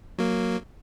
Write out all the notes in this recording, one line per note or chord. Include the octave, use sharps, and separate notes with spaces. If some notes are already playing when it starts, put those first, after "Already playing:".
F#3 A#3